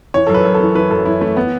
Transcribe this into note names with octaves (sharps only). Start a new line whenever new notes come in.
E3 C#5
A4
F#2 B4
F#2
A4
E3
E3 B4
F#2 A4
F#2 E4
E3 A3
B3